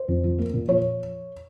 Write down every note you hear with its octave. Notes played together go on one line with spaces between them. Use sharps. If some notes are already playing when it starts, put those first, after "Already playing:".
Already playing: C5
F2
F3
A#3
A#2
F3 C#5